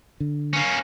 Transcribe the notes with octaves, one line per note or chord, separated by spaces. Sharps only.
D3
A#3 C#4